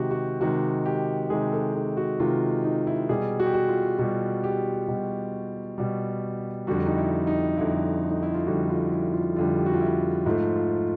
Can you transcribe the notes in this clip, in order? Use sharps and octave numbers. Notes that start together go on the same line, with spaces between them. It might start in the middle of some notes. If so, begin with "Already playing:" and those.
Already playing: C3 D#3 G#3 F#4 G4
F#4
C3 D#3 G#3 F#4
G4
C3 D#3 G#3 G#4
A4
G#4
F#4
C3 D#3 G#3 F4
D#4
E4
B2 G3 G#4
F#4
G4
F#4
F4
B2 G3 F#4
G4
B2 G3
B2 G3
F2 D3 G3 F#4
D#4
E4
D#4
F2 D3 G3 E4
D#4
E4
F4
F2 D3 G3 F#4
F4
E4
F4
F2 D3 G3 F4
G4
F#4
F4
E4
G#2 F3 A3 F4
F4